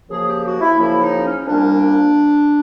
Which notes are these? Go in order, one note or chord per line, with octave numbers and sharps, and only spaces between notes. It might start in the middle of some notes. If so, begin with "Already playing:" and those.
F#2 C#3 F3 A#3 G#4
G4
F#4
E4
F#2 C#3 F3 A#3 E4
D#4
C#4
C2 A#2 G3 A#3 D4